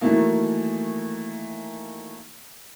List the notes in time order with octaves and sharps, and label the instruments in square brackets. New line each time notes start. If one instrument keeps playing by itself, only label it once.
[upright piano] D#3 E3 F#3 A3 A#3